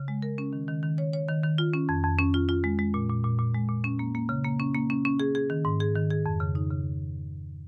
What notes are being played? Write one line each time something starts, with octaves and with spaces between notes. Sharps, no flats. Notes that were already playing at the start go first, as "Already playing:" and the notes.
Already playing: C#3
G#3
A#4
C#4
D#3
D#3
D#3
C#5
C#5
D#3
D#3
F4
C#4
F2
F2
C#4
F4
F4
G#3
G#3
A#2
A#2
A#2
A#2
G#3
A#2
C#4
A#3
A#3
C#3
A#3
C#4
A#3
C#4
C#4
G#4
G#4
D#3
G#2
G#4
D#3
G#4
F2
C#3
D#4
C#3